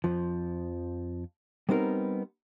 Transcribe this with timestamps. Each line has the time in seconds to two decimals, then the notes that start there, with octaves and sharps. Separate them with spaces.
0.04 F2 F3
1.69 G3 B3 C4 D#4 A#4